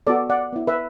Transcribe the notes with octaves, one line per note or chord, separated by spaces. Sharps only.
B3 F#4 A4 D5
D5 F#5
B3 E4
B4 E5